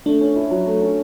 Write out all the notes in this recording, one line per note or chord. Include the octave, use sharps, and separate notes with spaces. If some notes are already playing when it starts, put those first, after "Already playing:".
A3 D4
C#4
E4
F#3
A3
C#4